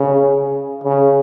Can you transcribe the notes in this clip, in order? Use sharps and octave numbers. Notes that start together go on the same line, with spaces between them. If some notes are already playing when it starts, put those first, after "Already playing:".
Already playing: C#3
C#3